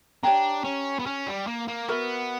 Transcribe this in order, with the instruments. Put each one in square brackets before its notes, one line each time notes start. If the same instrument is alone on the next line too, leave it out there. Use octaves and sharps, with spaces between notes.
[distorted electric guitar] D4 [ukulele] G4 C#5 G5 A#5
[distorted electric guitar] C#4
B3
C#4
G3
A#3
A#3
[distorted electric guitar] B3 [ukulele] F#4 A#4 E5